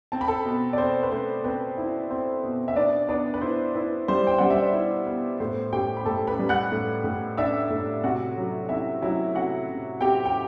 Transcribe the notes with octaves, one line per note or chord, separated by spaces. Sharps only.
C4 A5
B5
A4 A5
B2
D5
C4 C5
B4
A3 C5
C4 B4
E4
C4 C5
B2
E5
B3 D4 D5
B3 D4 D5
B4
E4 C5
E4 B4
G3 C5
G5
G3 F#5
E5
D5
E4 C5
B3
A2 C5
A2 G4 G5
B5
A2 A4 A5
B4 B5
G3
F#5 F#6
A2
A2
D4 E5 E6
A2
C3 F#4 F#5
F#3
C4 E4 E5
F#3 E4 E5
C3 F#4 F#5
C3
C4 G4 G5
G5